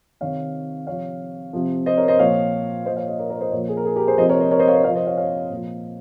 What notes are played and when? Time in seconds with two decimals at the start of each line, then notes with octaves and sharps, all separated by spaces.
0.21 C3 D#3 C#5 F5
0.87 C3 F3 C#5 F5
1.53 C3 F3
1.86 C5 D#5
1.97 A#4 C#5
2.08 C5 D#5
2.19 A#2 F3 C#5 F5
2.86 A#2 C5 D#5
2.90 F3
2.97 C#5 F5
3.08 C5 D#5
3.19 A#4 C#5
3.30 A#4 C#5
3.41 C5 D#5
3.52 A#2 A#4 C#5
3.56 F3
3.69 G#4
3.77 A#4
3.85 G#4
3.96 G4 A#4
4.07 G#4 C5
4.18 F3 C5 D#5
4.21 C3
4.29 A#4 C#5
4.40 C5 D#5
4.51 A#4 C#5
4.59 C5 D#5
4.67 C#5 F5
4.76 C5 D#5
4.84 C3 F3 C#5 F5
4.96 C5 D#5
5.07 C#5 F5
5.17 C#5 F5
5.50 A#2 F3